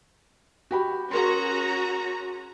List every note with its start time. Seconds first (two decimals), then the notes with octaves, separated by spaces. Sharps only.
0.71 F#4 G4 B5
1.11 C#4 F#4 G#4 A#4 A#5 C6